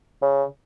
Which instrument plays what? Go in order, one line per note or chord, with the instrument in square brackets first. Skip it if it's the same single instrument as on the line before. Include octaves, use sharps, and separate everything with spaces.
[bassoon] C#3